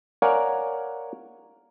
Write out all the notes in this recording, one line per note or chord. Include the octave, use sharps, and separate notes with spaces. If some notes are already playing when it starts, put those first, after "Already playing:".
A#4 C#5 D5 F5 F#5 G#5